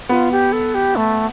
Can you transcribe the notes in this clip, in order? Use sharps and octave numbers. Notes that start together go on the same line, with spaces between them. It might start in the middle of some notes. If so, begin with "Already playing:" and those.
B3 F4
G4
A4
G4
A3